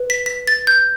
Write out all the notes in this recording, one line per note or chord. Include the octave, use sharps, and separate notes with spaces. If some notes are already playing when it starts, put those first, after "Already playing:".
Already playing: B4
B6
B6
A6
G6